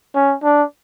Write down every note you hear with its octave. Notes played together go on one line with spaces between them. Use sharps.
C#4
D4